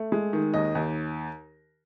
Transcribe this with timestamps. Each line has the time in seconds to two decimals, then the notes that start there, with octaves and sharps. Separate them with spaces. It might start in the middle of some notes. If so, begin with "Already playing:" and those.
Already playing: A3
0.12 G#3
0.33 D#3
0.54 D#2 D#5
0.75 D#2